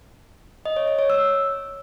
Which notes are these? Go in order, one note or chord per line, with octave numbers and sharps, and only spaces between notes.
D#5
C#5
C#5
C#5
E6